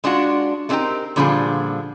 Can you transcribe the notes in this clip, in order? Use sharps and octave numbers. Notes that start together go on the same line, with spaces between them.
G#3 D4 F4 F#4
A3 C4 D4 D#4 G4 A#4
A#2 D3 F3 G3 D4 G#4